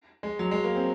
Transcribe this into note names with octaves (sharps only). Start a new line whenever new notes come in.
G#3
F#3
G#3
A#3
C4